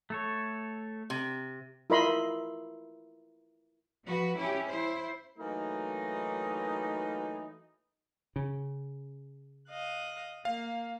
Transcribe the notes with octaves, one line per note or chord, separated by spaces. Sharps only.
A3 A4 C#5
C3
E4 F4 A#4 D#5 B5 C6
F3 F#4 B4
C#4 E4 G4
E4 C5
E3 F#3 A3 A#3 D#4
C#3
D#5 F5 F#6
A#3 F5